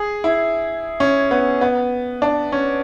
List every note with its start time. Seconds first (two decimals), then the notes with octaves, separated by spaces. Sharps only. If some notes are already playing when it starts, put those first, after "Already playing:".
Already playing: G#4
0.24 E4
1.00 C#4
1.31 B3
1.61 B3
2.22 D4
2.52 C#4